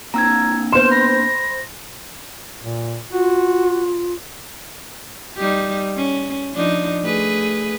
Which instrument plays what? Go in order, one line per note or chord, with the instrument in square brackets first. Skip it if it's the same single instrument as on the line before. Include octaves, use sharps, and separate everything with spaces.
[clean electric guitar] A#3 C4 D4 [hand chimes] A#5 E6 G#6
[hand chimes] B3 B4 G6 [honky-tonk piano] C5 C6 [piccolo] E7
[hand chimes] B5 [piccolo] A#6
[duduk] A#2
[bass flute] F4 [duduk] F#4
[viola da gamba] G3 D#4 G4
C#4
F3 D4 D#4
A3 G#4 B4